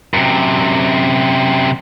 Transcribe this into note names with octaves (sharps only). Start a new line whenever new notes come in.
F#2 C3